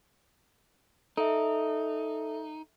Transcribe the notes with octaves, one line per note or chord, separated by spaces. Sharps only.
D#4 A4 E5